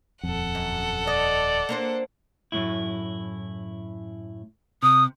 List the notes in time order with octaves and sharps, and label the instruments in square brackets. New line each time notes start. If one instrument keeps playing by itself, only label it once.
[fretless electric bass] D#1 F2 [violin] A4 F#5
[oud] F#2
[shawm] D5 [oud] D#5
[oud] A#3 D4 C5
[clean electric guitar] F#2 A2 E4
[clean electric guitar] C3 [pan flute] D#6